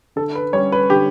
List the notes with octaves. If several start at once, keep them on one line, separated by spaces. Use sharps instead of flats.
D3 A4
B4
G3 C#4 C#5
B4
D3 G4